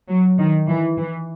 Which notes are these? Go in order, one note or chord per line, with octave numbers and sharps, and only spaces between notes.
F#3
D#3
E3
E3